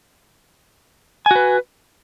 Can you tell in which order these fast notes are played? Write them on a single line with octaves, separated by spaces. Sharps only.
G#5 F#4 B4